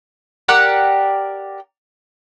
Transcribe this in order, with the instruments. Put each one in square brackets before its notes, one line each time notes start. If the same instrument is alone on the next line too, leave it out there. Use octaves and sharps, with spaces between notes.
[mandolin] G4 A#4 D5 F#5